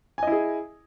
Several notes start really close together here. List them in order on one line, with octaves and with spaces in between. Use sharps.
G#5 D#5 E4 G#4